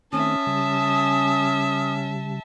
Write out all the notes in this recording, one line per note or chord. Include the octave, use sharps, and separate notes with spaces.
D#3 A3 C4 C#4 E5 A5 D#6
C#3 G3